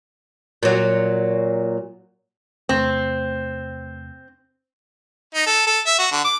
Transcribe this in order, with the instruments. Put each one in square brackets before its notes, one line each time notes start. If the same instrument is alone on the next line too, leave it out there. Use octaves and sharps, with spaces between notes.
[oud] A#2 F#3
[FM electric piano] E2 C3 A3 [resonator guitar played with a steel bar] C4
[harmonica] D#4
A4
A4
E5
F#4
D3
D6